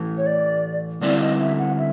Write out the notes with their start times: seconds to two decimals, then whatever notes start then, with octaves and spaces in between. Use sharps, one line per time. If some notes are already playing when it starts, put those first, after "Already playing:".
Already playing: A2 E3 A3
0.18 C#5
0.26 D5
1.01 D3 G3 C4 E4 D5
1.21 D#5
1.40 E5
1.59 F#5
1.77 E5